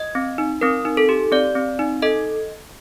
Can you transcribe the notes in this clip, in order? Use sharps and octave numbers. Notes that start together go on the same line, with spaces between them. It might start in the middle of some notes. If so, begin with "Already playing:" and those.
Already playing: D#5
C4
D#4
C4 A#4
D#4
A4
G4
C4 D5
C4
D#4
A4 D#5